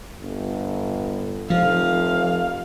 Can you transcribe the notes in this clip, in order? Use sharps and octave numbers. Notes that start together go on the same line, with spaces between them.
G1
F1 F3 F5